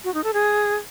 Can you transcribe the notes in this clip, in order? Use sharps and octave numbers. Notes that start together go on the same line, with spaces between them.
F#4
D#4
A4
G#4